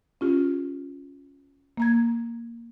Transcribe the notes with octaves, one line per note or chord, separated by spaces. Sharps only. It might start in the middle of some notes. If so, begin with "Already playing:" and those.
C#4 F4 G4
A#3 A#5 G#6